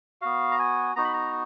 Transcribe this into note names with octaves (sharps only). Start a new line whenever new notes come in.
B3 F#4 F5
A#5
G#5
B3 D#4 F#4 A#5
B5
A#5